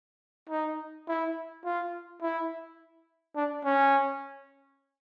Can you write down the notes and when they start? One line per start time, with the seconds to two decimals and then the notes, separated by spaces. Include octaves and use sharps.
0.49 D#4
1.08 E4
1.65 F4
2.21 E4
3.36 D4
3.64 C#4